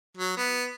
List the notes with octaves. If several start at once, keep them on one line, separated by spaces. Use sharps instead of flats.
F#3
B3